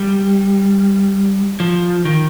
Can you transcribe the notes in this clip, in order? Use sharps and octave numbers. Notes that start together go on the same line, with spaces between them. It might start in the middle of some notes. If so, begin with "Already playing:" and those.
Already playing: G3
F3
D#3